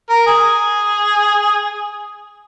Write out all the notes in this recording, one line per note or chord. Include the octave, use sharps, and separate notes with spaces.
A#4
G#4